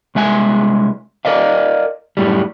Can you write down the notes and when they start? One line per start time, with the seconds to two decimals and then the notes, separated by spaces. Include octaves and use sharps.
0.15 C2 G#3 E5 G#5
1.25 A#4 D5 D#5 F5
2.17 F#2 A2 G3